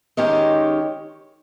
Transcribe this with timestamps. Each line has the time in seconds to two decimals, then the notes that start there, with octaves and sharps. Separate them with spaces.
0.17 D#3 G#3 C#4 G4 C#5